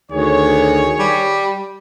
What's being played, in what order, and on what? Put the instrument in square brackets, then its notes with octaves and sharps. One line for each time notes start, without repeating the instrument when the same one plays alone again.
[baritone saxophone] D2 [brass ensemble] D#3 G#4 C#5
[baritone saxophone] G3